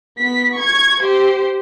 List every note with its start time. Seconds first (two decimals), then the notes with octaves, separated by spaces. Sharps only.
0.17 B3 B6
0.54 C#6 G#6
1.00 G4 C5